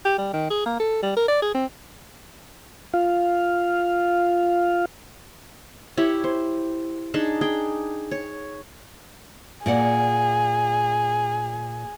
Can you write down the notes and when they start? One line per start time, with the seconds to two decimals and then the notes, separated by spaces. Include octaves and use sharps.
0.05 G4
0.18 G3
0.33 D#3
0.51 G#4
0.66 A#3
0.80 A4
1.02 G3
1.16 A#4
1.28 D5
1.42 G#4
1.54 C4
2.94 F4 F5
5.97 E4 G4 C#5
6.24 C5
7.14 D4 D#4 G#4 A5
7.41 G#4 G5
8.11 C#5
9.66 A#2 G#4 D5 F#5